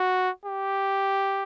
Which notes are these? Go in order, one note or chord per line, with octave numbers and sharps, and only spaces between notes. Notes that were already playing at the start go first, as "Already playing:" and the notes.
Already playing: F#4
G4